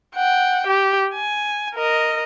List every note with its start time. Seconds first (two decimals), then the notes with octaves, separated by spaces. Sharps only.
0.16 F#5 G5
0.67 G4
1.14 G#5
1.75 A#4 D#5